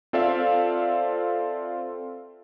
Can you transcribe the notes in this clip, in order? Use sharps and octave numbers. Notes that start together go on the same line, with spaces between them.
C4 F4 A4 D5 E5 F5